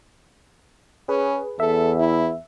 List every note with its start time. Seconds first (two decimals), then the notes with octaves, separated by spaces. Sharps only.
1.09 C#4 G#4 B4
1.60 E2 A4 E5
2.00 E4